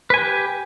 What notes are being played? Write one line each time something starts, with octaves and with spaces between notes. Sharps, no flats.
G4 B4 G#5